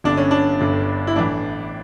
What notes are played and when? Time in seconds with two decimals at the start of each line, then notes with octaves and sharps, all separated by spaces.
0.04 G1 G2 D3 D4
0.17 C#4
0.31 D4
0.61 G1 G2 D3
1.07 E4
1.16 A1 A2 E3 D4